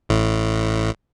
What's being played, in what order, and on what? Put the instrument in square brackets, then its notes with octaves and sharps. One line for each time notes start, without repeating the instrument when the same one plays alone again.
[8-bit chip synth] A1 A2